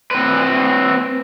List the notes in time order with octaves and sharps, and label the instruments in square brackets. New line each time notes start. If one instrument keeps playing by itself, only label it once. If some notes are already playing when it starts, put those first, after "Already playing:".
[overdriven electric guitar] C4 B4